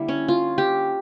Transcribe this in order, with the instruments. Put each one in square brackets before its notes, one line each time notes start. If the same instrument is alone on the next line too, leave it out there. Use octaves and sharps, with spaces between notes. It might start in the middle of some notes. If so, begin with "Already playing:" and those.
Already playing: [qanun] D3 G3 A#3 E4
C#4
F4
G4